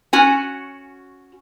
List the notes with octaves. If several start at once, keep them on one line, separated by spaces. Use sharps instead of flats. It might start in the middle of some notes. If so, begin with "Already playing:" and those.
C#4 F#4 G#5